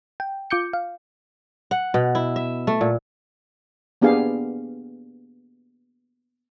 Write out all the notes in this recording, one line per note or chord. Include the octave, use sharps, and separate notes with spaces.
G5
F4 D6 G6 C#7
F5
F#5
B2
E4
E5
A3
A#2
A#3 B3 D4 G4 G#4 F5